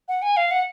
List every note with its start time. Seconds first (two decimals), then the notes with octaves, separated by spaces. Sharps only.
0.08 F#5
0.22 G#5
0.37 F5
0.51 F#5